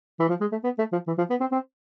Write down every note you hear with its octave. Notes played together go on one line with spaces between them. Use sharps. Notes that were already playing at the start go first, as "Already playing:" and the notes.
E3
F3
G#3
A3
B3
A3
F3
E3
F3
B3
C4
C4